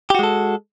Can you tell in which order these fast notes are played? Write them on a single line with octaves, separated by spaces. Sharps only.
G4 F#4 G#3 A4